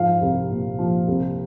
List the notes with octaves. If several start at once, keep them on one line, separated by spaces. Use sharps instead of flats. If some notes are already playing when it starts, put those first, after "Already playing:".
Already playing: G#2 F3 F5
C2
A#2
F3
C2